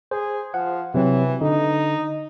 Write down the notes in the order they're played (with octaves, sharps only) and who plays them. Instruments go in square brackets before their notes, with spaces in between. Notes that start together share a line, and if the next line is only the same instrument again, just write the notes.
[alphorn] G#4 [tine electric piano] C5
[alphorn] F3 [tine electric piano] F#5
[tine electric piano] C3 F#3 C4 [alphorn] E3
[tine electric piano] D3 [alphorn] D#4